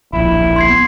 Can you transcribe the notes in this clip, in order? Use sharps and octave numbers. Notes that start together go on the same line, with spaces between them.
D1 A#1 E4
C6 G#6 C7
B3